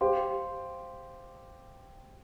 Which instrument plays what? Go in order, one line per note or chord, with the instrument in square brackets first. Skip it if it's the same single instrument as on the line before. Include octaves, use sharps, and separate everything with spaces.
[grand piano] G4 [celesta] C5 F5 C6